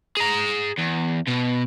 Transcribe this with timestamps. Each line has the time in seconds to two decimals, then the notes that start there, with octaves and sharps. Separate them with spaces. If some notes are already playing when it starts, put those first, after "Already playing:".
0.17 G#4 A#5
0.78 E2
1.28 B2